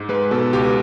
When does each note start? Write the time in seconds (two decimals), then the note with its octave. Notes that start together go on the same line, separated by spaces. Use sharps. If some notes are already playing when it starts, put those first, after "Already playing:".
Already playing: G#2
0.09 G#3 B4
0.31 B2 A4
0.53 C#2 G4